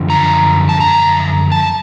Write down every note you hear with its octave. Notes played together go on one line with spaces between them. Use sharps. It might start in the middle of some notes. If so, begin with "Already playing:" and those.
Already playing: F#2 D3 F3
A#5
A5
A#5
A5